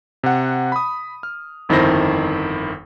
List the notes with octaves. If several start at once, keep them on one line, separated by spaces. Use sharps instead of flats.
C3 F#5
B5 D#6
F6
G1 F2 D#3 E4 C5 A#6